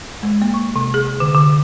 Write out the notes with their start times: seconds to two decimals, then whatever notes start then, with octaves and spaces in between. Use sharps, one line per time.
0.23 G#3
0.42 A#3
0.54 C#6
0.76 C3
0.94 G#4
1.20 D3
1.35 D3